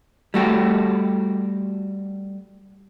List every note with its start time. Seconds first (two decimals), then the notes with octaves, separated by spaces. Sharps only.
0.34 G3 A3 F#4 G4